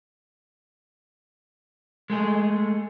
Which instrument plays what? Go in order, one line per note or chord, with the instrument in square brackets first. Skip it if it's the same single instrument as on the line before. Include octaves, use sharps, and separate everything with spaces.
[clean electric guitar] G#3 A3 G#4